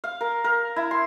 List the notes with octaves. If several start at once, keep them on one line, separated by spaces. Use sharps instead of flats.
F5
A#4
A#4
E4
C6